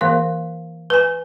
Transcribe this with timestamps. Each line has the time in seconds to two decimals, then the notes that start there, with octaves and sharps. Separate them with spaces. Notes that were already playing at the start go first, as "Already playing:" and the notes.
0.01 E3 A#3 A#4 F5
0.90 B4 G#5